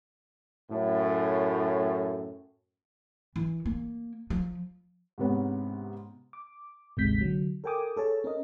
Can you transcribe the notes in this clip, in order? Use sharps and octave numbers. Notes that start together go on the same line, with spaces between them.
F#2 A2
E3
A#3
F3
G#2 C3 B3 C#4
D6
G#1 D2 C3 G#3 G6 B6
D3 F#3
A4 A#4 G5 G#5 D6 D#6
G#4 A4 C#5 A5
C#4 A#4 D#5